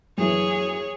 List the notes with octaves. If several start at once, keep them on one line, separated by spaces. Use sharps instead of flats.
F#2 E3 G#4 C#5